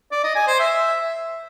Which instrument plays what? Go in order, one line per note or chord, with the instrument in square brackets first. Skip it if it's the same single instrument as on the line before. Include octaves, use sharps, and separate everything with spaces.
[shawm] D5
D#5
G#5
C5
E5